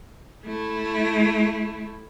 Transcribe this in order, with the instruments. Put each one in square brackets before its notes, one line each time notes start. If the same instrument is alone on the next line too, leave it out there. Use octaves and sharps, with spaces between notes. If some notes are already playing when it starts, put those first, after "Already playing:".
[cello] A3 E4